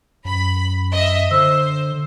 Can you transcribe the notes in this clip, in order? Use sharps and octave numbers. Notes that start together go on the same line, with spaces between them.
F#2 B5
D#5 E5
D3 C5 E6